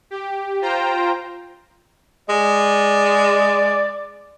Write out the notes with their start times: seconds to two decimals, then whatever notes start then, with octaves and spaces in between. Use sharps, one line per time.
0.11 G4
0.61 F4 C5 G5 A#5
2.29 G#3 D5